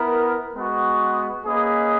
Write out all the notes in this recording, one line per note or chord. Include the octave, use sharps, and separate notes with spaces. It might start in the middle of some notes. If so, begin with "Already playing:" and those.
Already playing: B3 E4 A#4
G#3 B3 F#4
A#3 C#4 G#4 B4 D#5